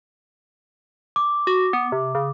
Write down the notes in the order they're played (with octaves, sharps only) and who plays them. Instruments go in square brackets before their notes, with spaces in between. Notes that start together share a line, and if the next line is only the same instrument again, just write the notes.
[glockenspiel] D6
[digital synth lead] F#4
B3
C3
C#3